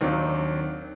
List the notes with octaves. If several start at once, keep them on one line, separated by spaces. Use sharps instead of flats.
D#2 D#3 F#3 C4 D4